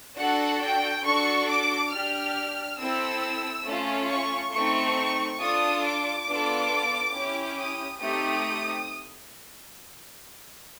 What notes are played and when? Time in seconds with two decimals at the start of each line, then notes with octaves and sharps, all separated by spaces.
0.18 D4 F#4 A4 F#5
0.62 G5
1.05 D4 F#4 A4 C#6
1.49 D6
1.92 D4 G4 F6
2.78 C4 E4 A4 E6
3.65 A3 C#4 F4
4.09 C#6
4.52 A3 C4 D#4 C#6
5.39 D4 F4 A4 D#6
5.84 D6
6.27 B3 D4 F4 A4
7.13 C#4 E4 G4
7.57 D#6
8.00 A3 C4 D#4 G4 D#6